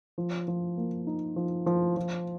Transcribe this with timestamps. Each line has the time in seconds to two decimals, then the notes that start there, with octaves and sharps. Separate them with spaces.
0.18 F3
0.48 F3
0.77 A#3
1.07 D#4
1.36 F3
1.66 F3
1.97 F3